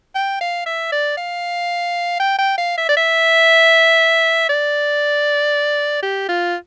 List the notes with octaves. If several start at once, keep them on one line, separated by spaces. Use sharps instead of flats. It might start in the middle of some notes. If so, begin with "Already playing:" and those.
G5
F5
E5
D5
F5
G5
G5
F5
E5
D5
E5
D5
G4
F4